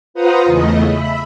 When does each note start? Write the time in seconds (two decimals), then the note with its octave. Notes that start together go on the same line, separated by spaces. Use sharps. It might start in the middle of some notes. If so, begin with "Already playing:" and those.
0.14 F4 B4 C5 F#5 A#5 D#6
0.45 E2 C#3 A3 D#5
0.86 E5 B5